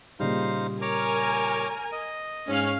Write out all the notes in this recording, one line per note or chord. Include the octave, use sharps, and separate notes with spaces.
A#2 C#3 G3 D#4 C5 F5
A#4 C#5 G#5 A#5 D6
D#5
G#2 C#4 F5